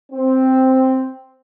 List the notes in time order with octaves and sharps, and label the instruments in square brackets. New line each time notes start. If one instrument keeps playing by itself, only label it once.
[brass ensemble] C4